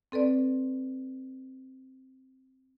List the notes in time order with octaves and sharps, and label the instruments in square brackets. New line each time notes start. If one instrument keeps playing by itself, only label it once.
[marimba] C4 A4 B4 D5